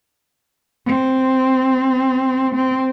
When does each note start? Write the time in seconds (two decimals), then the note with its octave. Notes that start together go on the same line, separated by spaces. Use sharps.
0.86 C4
2.55 C4